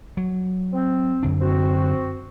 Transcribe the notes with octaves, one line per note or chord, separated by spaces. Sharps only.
F#3
C4
F#2 D3 D4
C4 F#4